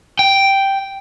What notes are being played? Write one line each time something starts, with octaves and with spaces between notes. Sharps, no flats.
G5